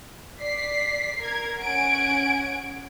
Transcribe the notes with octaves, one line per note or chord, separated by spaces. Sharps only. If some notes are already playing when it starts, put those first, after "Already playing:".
D5 B6 C7
A#4 G#6
C#4 F#5 G#5 G#6 D7